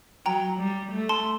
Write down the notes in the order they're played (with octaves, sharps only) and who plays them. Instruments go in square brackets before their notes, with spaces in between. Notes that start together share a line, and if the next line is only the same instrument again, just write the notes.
[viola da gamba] F#3 [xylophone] G5 A#5
[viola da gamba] G3
A3
[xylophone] A5 C6